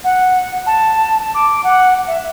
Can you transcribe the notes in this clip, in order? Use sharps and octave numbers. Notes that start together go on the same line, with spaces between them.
F#5
A5
D6
F#5
E5